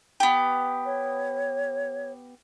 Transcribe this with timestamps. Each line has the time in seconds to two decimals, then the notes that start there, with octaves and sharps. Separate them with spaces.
0.20 B3 G4
0.85 C#5